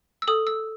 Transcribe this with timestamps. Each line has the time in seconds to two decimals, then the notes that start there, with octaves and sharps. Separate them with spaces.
0.22 E6
0.27 A4 D#6
0.47 E6